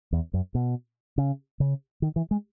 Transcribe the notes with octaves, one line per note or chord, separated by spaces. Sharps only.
E2
F#2
B2
C#3
C#3
D#3
E3
G#3